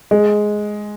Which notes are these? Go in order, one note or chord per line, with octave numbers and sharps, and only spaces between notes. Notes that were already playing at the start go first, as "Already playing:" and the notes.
G#3